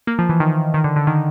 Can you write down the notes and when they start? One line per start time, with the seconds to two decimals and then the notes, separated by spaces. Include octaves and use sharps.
0.07 A#3
0.19 F3
0.29 E3
0.40 D#3
0.74 D#3
0.84 D3
0.96 D3
1.07 D#3